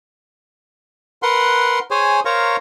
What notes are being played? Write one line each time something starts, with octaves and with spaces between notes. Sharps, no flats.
A#4 B4 F#5 C6
G#4 C5 C#5 G#5
A#4 C5 C#5 F5 A#5 C#6